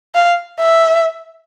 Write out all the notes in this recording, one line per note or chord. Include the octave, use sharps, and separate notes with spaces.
F5
E5